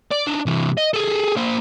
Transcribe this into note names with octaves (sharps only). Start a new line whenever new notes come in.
D5
D4 D#4
C3 E3
D#5
G#4 A4
A#3 C5